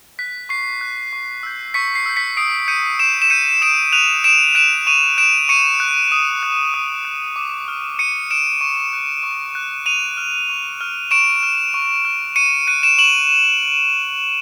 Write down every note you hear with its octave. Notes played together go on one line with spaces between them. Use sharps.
F#6 B6
C#6 C7
F#6
C#6
E6 G6
C#6 B6 C#7
C7
E6 G6
B6 C#7
D#6 C7 D7
G6 C#7 D#7
D#6 D7 E7
E7
G6 C#7 D#7
D#6 D7 E7
F#6 D#7 F7
D#6 D7 E7
F#6 D7 E7
C#6 D#7 F7
F#6 D7 E7
C#6 C#7 D#7
F#6
D#6
F#6
D#6
F#6
D6
F6
D6 C#7 D#7
F6 D7 E7
C#6
F#6
C#6
F#6
C#6 D#7 F7
F6
C#6
F6
C#6 D7 E7
F6
C#6
F6
C#6 C#7 D#7
F#6 C#7 D#7
D7 E7
C#6 E7 F#7